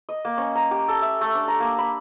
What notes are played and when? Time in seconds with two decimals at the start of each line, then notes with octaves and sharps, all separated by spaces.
0.09 D#5
0.25 A#3
0.38 C#4
0.55 A#5
0.71 G4
0.88 A4
1.02 E5
1.21 A3
1.35 D4
1.48 A#5
1.60 A#3
1.78 B5